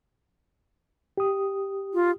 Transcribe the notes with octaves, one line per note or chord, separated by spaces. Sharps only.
G4 D#6
F4